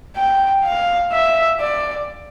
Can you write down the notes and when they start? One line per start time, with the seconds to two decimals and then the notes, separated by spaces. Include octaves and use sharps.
0.16 G5
0.64 F5
1.12 E5
1.60 D5